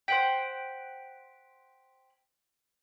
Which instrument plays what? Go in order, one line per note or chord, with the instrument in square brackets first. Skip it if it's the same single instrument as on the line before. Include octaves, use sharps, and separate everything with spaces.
[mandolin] C5 F#5 G5 [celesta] B6 D7